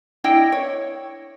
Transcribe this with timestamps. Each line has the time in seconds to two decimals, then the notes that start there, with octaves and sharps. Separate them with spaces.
0.24 D4 E4 D#5 G5
0.52 C#5